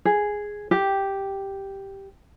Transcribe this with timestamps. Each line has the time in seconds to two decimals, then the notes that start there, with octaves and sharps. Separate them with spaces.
0.05 G#4
0.71 G4